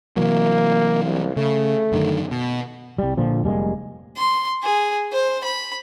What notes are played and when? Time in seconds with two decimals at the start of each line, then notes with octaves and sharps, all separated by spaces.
0.16 C3 E3 F#3 A#3
1.04 C2
1.37 C#3 A3
1.92 F#2 D3 D#3
2.31 B2
2.98 C2 G3
3.17 A#2 D3 F3
3.44 F1 G3 G#3 A#3
4.16 C6
4.63 G#4
5.13 C5
5.44 B5